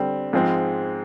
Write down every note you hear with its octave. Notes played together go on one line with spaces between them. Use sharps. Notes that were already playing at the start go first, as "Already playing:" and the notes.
Already playing: D3 G3 C4
G#2 F3 G#3 C4